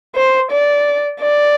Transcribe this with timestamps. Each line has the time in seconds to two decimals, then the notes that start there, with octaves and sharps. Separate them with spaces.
0.15 C5
0.51 D5
1.20 D5